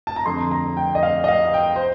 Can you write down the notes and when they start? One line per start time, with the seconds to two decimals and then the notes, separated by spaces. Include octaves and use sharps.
0.07 A5
0.16 A#5
0.26 F2 D3 C6
0.51 A#5
0.77 G5
0.95 D#5
1.03 F5
1.24 D#5
1.28 F5
1.54 G5
1.76 C5